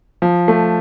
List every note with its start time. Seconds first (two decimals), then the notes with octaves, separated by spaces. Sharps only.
0.22 F3
0.48 A3